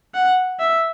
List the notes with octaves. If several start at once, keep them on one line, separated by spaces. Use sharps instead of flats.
F#5
E5